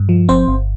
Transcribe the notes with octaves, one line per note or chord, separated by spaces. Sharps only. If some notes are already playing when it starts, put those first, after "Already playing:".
Already playing: G2
F3
G1 C4 C5
G1